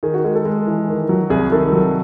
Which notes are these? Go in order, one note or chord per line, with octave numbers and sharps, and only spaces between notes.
D#3 G#4
F#4
G#3 G#4
A4
G#3
E3
D#3
F#3
C2 G#4
D#3 A4
F#3